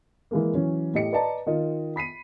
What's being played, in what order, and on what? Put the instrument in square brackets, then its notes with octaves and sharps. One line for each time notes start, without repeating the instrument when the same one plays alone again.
[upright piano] E3 G#3 A#3
E3 F#3 C#4
A2 G4 D#5 C#7
B4 D5 D#5 A5 A#5
D#3 F4 D#5
B5 B6 C7 D#7